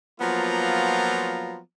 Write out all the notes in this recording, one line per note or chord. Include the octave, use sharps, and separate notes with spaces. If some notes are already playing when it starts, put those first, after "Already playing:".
F3 F#3 A#3 B3 F4 A#5